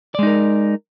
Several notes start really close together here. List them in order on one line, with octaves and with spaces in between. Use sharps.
D5 G#3 D#4 A#4